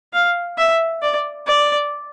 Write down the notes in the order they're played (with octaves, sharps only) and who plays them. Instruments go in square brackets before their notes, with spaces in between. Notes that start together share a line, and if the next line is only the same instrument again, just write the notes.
[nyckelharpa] F5
E5
D5
D5